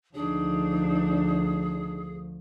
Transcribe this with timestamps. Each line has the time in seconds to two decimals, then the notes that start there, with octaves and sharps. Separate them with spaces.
0.15 D2 F3 D4 D#4 G#4